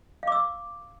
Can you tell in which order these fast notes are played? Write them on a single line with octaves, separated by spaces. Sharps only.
F5 D6 E6